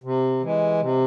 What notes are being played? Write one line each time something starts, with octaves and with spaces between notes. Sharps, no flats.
C3
E3 G#3
C3